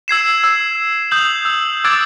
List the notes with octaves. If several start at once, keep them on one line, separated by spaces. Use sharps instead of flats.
E6 G#6 C7 E7
E6
D#6 G6 F#7
E6
D6 E6 F#6 G#6 A6 D7